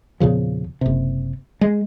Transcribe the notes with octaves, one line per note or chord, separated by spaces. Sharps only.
E2 A#2 C#3 F3
F#1 C3
G#3